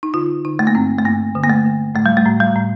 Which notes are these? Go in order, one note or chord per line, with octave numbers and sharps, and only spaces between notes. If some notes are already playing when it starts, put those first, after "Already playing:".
D#4
D3 F4
D3 D#4
A3
A#3
G2 C4
A3
G2 A#3
D3
A#3
A3
D3
A2 A3
G3
A3
A2
G3
A2